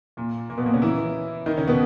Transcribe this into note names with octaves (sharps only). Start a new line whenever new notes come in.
A#2 A#3
A#2 A#3
B2 B3
A#2 A#3
C#3 C#4
E3 E4
D#3 D#4
C#3 C#4
B2 B3